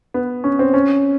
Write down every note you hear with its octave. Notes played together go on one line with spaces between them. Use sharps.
B3
C#4
C4
C#4